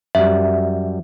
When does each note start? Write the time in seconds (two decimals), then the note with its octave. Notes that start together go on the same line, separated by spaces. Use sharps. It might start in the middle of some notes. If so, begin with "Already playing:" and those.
0.15 F#2 G3 E5